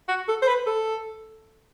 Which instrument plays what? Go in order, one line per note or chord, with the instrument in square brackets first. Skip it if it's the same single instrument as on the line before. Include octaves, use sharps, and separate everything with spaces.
[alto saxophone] F#4
A4
C5
B4
A4